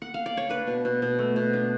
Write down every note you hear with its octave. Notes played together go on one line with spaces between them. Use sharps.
F#5
F5
D5
C#5
D4 B4
B2
B2
B2
A3
B2
D4